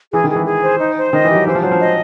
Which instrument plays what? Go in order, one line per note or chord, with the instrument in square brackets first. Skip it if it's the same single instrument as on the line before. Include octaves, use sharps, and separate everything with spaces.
[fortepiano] E3 [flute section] G#4
[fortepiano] D#3
[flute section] G#4
[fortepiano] E3
[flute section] G#4
C5
D#4
C5
[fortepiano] D#3 [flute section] D#5
[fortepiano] E3
[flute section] G4
[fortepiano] F#3
[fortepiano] E3 [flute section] C5
[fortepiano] F3
[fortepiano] F#3 [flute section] C5
[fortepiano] F3
[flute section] D#5